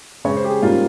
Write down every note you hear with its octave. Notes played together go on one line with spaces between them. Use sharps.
C#3 G#3 C#4 C#5
C5
G4
G#4
G#2 G3 A#3 C#4 F4